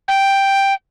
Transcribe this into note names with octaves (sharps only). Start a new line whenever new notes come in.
G5